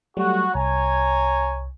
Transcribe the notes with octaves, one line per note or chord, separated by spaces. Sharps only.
F#3 G3 A3 F#4
C2 C#5 G#5 A#5